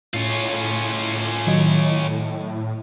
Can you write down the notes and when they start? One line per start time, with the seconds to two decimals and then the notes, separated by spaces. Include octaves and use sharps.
0.14 A2 C#4 F4
1.47 D#3 F#3 D#5